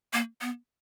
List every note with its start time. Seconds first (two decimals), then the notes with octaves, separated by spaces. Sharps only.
0.13 A#3
0.41 B3